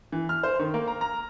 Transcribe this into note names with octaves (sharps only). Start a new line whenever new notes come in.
E3
F6
C5
D#3
A#3
A#5
A#5